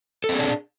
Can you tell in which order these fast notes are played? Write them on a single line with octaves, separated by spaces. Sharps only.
A4 C4 G#4 D4